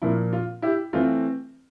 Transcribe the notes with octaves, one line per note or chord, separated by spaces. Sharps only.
A#2 F3 A#3 E4
F4
E4 G4
E3 A3 C4 F4